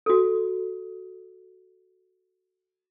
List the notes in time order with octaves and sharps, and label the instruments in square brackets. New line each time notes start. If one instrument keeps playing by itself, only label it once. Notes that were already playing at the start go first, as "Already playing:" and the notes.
[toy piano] F#4 A4